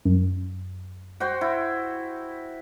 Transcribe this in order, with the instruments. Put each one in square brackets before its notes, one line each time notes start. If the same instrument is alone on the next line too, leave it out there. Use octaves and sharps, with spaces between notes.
[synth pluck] F#2
[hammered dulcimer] F#4 C5 G5
E4